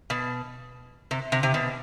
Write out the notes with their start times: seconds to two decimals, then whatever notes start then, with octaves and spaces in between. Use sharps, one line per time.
0.10 B2
1.11 C3
1.32 C3
1.43 C3
1.54 B2